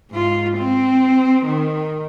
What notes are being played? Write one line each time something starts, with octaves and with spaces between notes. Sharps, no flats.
G#2 F4
C4
D#3